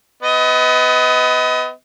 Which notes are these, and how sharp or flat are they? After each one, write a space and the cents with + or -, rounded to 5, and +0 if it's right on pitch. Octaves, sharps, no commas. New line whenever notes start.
B3 +25 D#5 +30